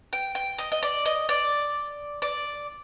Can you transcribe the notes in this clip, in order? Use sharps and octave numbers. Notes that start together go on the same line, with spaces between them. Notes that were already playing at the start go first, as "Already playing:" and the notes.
G5
G5
D#5
D#5
D5
D#5
D5
D5